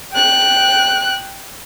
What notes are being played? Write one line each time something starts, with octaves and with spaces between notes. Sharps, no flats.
G5 F#6